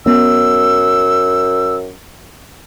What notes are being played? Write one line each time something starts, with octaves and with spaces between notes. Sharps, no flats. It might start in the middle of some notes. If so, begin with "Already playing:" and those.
F#2 B3 C#4 E6